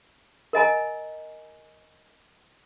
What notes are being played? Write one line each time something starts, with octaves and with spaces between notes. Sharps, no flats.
A#4 D#5 G#5 A#5